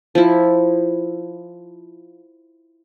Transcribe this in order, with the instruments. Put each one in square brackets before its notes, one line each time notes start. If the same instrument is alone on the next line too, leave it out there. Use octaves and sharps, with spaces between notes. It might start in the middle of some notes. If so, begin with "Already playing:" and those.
[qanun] F3 E4